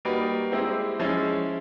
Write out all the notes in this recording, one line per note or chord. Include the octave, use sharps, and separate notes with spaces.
G3 A#3 D#4 F#4 B4
G#3 C4 E4 G4
F3 G#3 C#4 E4